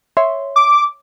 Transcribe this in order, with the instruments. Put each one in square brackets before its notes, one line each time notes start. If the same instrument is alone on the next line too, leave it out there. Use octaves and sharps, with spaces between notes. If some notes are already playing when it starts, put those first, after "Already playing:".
[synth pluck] C#5 E5 C6
[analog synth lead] D6